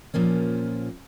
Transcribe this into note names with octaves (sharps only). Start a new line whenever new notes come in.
A#2 F3 A#3 C#4